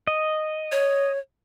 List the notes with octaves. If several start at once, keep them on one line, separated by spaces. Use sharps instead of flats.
D#5
C#5